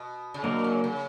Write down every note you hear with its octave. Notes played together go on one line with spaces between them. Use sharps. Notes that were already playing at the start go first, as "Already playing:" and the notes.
Already playing: B2
C#3
B2 F#3 A#3 D4 A#4
C#3
C#3